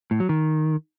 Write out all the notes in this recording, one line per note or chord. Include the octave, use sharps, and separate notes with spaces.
A2
F#3
D#3